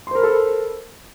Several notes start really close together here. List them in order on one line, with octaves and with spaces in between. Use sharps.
C6 C5 A#4 B5 A4